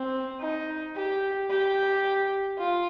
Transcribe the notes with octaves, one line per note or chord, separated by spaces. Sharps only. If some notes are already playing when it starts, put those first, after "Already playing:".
Already playing: C4
D#4
G4
G4
F4